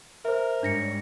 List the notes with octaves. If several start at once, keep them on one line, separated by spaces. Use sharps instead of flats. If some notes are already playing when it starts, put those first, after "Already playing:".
A#4 C5 E5
G#2 G3 D4 C#5 A#6 C#7